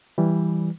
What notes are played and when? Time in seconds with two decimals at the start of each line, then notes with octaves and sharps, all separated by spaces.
0.18 E3 G3